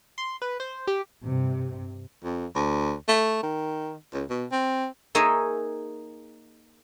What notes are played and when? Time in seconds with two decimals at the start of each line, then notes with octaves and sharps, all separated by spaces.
0.18 C6
0.42 B4
0.60 C5
0.87 G4
1.24 G2 C3
2.24 F2
2.55 D2
3.08 A3
3.43 D#3
4.14 C#2
4.30 B2
4.51 C4
5.15 A#3 D#4 G#4 C#5 D#5 E5